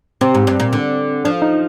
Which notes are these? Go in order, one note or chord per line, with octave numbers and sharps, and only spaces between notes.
C3 C4
G#2
G2
A#2
D3
F3 D4
D#4